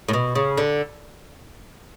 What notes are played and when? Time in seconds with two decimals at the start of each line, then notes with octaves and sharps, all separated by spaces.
0.08 A2
0.13 B2
0.35 C#3
0.58 D3